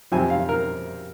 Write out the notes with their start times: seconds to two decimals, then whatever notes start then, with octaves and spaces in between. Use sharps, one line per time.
0.12 F2 C3 F3 C4 G#5
0.30 F5
0.49 A#4